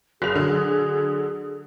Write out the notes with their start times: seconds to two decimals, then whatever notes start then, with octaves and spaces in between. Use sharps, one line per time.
0.22 F#1 G#4 F7
0.35 D3 F#3